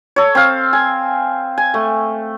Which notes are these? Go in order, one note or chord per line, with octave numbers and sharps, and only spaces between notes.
A4 C#5
C4 F5
G#5
G#5
A3